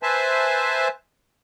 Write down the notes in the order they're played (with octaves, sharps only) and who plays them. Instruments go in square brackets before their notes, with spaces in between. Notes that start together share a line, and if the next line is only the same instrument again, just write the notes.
[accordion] B4 C5 E5 G#5 A5